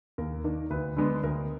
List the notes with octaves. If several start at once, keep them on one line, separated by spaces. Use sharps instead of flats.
D#2 A#4
D#3 A#3 D4
D2 B4
D3 G#3 B3 D4
D2 A#4